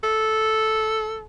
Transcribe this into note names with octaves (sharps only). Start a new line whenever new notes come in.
A4